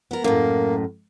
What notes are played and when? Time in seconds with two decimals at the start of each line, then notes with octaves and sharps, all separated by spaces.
0.11 B3 A#4
0.24 F#2 A2 A#3